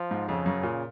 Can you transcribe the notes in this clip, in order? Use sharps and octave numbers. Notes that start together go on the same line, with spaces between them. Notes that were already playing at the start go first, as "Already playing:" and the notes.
Already playing: F3
G#2
F2 C#3
F#2
A#2